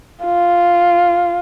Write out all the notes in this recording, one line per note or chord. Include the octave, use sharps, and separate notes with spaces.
F4